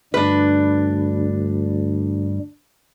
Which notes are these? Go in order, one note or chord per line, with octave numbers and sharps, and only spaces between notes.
D2 G2 G3 D4 B4